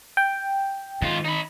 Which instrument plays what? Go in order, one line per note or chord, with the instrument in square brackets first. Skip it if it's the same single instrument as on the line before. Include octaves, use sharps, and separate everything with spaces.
[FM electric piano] G5
[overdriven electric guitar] G#2 F4 [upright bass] D#3
[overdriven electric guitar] D#4 B5